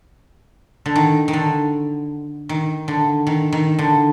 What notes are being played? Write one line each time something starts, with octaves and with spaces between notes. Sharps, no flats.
D3
D#3
D#3
D3
D#3
D3
D#3
D#3
D3